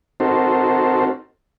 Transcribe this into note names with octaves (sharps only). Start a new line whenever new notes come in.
C4 D#4 F#4 A4 A#4 C5